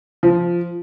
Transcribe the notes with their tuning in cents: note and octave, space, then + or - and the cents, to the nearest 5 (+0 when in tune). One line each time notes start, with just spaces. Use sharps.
F3 -10